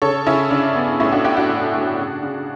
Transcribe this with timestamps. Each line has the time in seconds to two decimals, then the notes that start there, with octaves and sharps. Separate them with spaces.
0.02 C#3 A4 C#5
0.26 C#3 C#4 E4
0.51 C#3 D4
0.76 B3
1.00 A2 C#4 E4
1.12 D4 F#4
1.24 A2 E4 G4
1.37 D4 F#4
1.49 A2
1.74 A2
1.98 C#3
2.23 C#3